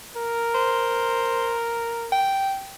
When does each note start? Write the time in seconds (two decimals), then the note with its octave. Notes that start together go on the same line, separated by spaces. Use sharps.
0.16 A#4
0.55 C5
2.12 G5